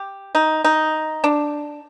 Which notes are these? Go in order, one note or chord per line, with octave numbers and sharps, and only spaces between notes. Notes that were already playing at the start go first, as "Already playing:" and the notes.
Already playing: G4
D#4
D#4
D4